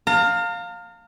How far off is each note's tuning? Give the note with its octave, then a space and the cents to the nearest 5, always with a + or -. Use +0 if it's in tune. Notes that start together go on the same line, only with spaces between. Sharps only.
F5 +15 A#5 -40